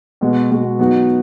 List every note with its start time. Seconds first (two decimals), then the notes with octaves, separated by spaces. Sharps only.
0.21 B2 G#3 B3 F#4
0.50 B2 G#3 B3 F#4
0.79 F#3 B3 D#4 F#4